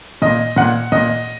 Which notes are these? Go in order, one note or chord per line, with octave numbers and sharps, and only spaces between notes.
A#2 D#5
A#2 F#5
A#2 D#5